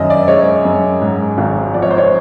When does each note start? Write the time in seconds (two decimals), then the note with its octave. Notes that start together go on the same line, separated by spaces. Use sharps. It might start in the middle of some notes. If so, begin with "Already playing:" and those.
Already playing: F#2 D#3 D#5 E5
0.10 D5
0.28 G#3 C#5
0.65 F#2
1.01 G#2
1.38 G#1
1.74 F3 D5
1.82 C#5
1.91 C5
1.98 C#5